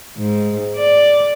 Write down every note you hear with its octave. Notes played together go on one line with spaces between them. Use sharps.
G#2
D5